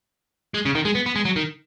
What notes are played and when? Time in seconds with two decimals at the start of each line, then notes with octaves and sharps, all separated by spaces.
0.54 G#3
0.65 C#3
0.75 D#3
0.85 G#3
0.95 B3
1.06 B3
1.16 G#3
1.25 F#3
1.36 D#3